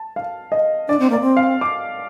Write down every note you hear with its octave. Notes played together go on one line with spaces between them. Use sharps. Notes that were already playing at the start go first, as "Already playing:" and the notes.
Already playing: A5
F5
D#5
D4 D5
C4
A#3 D5
C4
F5
D6